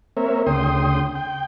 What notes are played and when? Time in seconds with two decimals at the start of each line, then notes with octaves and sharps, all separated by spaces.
0.17 A#3 C4 A#4 C#5 E5
0.47 D2 C#3 G5 C6 D#6
1.15 G5